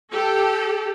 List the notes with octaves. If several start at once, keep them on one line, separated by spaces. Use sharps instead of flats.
G4 A4